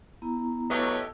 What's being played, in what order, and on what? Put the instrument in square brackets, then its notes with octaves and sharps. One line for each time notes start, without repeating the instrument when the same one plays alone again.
[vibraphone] B3 E4 A#5
[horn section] F#3 B4 C#5 [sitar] A3 G4 D#5